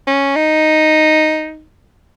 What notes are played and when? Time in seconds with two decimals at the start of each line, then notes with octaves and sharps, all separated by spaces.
0.07 C#4
0.36 D#4